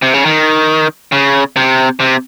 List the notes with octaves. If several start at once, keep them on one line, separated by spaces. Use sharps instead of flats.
C3
C#3
D#3
C#3
C3
C3